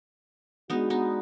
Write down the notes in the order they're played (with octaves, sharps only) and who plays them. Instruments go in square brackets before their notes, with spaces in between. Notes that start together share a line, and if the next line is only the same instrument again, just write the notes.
[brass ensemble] G#3 D4 F#4 [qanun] B3 D#4
[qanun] B3 D#4